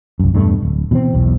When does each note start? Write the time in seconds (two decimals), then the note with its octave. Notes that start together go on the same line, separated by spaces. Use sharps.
0.20 C2 F#2
0.34 E2 G2 B2 A3
0.62 D1
0.91 B2 E3 B3 C4
1.14 B1 E2